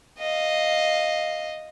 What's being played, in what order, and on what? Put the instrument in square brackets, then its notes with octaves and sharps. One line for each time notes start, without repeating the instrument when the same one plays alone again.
[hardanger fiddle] D#5 F5